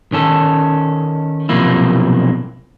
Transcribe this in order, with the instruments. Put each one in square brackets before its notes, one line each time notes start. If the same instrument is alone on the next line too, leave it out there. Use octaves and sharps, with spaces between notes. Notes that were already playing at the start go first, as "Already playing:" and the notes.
[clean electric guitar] D#3 C#4 A4
B1 C3 F3 A#3 E4